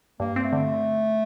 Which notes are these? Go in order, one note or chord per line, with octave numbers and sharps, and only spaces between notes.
G2 A#3
C4
A3
D3